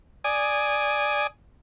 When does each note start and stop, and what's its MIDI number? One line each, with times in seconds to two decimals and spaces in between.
0.24 1.27 74
0.24 1.27 80
0.24 1.27 87